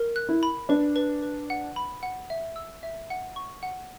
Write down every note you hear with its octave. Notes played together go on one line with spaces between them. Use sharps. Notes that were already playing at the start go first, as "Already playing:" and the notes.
Already playing: A#4
F#6
E4
B5
D4 B4
B4
B4
F#5
B5
F#5
E5
E6
E5
F#5
C#6
F#5